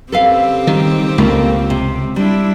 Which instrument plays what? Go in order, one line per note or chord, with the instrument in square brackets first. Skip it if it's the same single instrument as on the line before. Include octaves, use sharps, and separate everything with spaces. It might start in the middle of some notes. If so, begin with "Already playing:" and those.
[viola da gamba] C#3 C4 G4 [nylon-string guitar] A4 B4 F5
[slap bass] D#3 [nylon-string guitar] G3 D#4
[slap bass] C#2 [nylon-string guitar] A3 A#3 F4
[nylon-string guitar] C3
[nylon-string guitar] G3 [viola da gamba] D4 E4